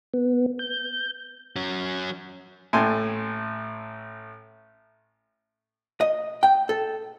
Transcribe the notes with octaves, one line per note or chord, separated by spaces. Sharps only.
B3
G6
F#3 C#4
A1 A2 A4 G5 G#5 C6
D#5
G5
A4